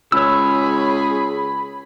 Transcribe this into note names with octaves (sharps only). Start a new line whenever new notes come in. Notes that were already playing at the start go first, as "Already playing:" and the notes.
C#2 G#4 C#5 B5 E6